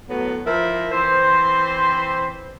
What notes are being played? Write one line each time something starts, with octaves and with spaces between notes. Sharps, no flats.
A2 F#3 B3
F3 E4 A#4
E3 C4 C5